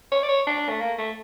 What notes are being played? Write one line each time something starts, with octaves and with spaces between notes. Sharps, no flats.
C#5
D5
C#5
D4
A3
A#3
A3